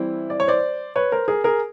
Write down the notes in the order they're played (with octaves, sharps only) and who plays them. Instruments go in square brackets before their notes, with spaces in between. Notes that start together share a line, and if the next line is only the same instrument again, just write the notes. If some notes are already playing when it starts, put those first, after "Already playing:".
Already playing: [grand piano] E3 G3 C4 E4
D5
C#5
C5 D5
B4 C#5
A#4 C5
G#4 A#4
G#4 A#4